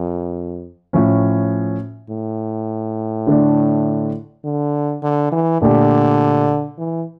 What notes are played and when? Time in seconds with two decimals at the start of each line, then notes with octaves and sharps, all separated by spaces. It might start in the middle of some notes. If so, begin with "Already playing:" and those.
Already playing: F2
0.93 A2 F3 C#4
2.10 A2
3.27 D3 A3 D4
4.44 D3
5.03 D3
5.32 E3
5.61 A#2 D3 A3 D4 G4
6.78 E3